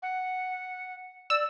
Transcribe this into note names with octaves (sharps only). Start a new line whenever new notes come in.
F#5
D5 E6